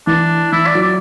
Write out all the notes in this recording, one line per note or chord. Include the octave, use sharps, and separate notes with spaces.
E3 D4
E3 E4
D5
F#3
D5